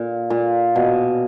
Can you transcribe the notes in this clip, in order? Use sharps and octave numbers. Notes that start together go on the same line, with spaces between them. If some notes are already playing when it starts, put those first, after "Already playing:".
Already playing: A#2
A#2
B2